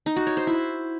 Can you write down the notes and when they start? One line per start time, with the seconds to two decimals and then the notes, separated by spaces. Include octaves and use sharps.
0.06 D#4
0.16 F#4
0.27 C#5
0.37 C5
0.47 E4